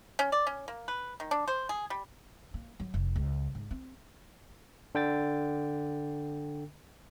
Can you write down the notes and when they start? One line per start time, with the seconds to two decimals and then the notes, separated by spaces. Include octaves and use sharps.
0.19 C#4
0.32 D5
0.47 C#4
0.68 A#3
0.88 B4
1.20 D#3
1.31 D4
1.48 C5
1.69 G#4
1.90 G3
2.54 A#3
2.80 F#3
2.94 F1
3.16 C#2
3.55 G#2
3.71 C4
4.95 D3 G5 A6